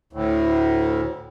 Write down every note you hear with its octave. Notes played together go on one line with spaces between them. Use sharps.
D2 A2